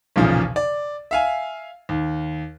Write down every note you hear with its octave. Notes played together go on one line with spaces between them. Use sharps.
B1 E2 A#2 C#3 F3
D5
E5 F5 G#5
D#2